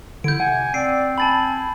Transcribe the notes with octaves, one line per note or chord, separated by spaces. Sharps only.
D3 E4 G6 D7
C3 F#5 G#5
C4 D5 C7 D7
G#5 A5 B5 A6 F#7